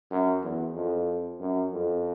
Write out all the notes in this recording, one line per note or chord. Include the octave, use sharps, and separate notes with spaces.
F#2
E2
F2
F#2
F2